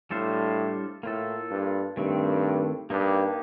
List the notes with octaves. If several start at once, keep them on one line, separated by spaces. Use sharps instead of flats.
A2 G3 D4 A4 C5 F5
A2 A#3 F4 A4
G2
G2 D#3 A3 C4
G2 A#3 D#4 G4